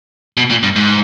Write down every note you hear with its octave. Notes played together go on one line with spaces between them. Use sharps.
B2
A#2
G2
G#2